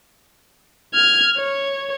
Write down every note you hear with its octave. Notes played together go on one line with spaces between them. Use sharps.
F6 G#6
C#5